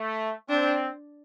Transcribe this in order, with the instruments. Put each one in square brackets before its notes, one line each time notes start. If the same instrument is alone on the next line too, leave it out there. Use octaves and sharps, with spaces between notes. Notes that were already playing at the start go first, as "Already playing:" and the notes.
Already playing: [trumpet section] A3
[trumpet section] C4 [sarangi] D4